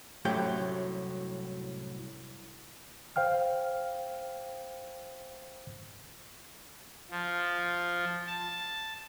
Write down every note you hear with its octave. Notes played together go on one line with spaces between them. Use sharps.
C2 F#2 A2 F#3 G4 G5
C5 F5 G5 F6
F3
A5